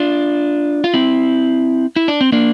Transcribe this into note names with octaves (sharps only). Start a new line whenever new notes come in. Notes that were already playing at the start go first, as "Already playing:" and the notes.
Already playing: D4 F4
F4
C4 E4
E4
D4
C4
A#3 D4